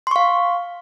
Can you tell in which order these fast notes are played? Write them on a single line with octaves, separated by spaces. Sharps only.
C6 C#6 F5